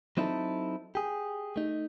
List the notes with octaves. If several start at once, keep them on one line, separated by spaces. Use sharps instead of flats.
F#3 C4 D#4 E4 F#4 A4
G4 G#4
A3 D#4